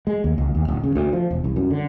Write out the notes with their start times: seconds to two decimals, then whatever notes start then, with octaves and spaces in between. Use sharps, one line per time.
0.07 G#3
0.24 D#2
0.38 C#2
0.55 D#2
0.68 D1
0.84 C#3
0.95 D2
1.13 F3
1.31 E1
1.44 C2
1.56 F#2
1.71 D3